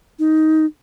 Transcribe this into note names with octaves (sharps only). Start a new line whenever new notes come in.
D#4